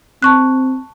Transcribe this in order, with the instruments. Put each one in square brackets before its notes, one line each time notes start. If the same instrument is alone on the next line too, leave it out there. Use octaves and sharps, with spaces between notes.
[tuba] C4 [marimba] A5 C#6 F#6